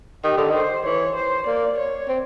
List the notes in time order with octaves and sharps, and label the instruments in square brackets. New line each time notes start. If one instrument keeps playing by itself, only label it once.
[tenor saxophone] D#3 [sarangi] G4
[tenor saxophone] D3
[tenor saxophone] D#3 [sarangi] C5
[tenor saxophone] E3 [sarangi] C#5
[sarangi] C5
[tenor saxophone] A#3 [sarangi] D5
[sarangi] C#5
[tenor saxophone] C4